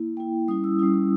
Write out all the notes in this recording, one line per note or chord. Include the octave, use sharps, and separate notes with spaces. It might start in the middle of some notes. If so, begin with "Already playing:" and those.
Already playing: A#3 E4
A#3 E4 G5
G3 C#4 E4 D#6
E6
G3 C#4 E4 D#6
E6